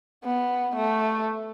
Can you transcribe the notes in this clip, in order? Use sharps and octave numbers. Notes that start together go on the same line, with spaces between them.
B3
A3